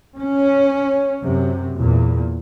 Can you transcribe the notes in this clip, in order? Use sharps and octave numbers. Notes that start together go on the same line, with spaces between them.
C#4
F#2 C3
E2 A#2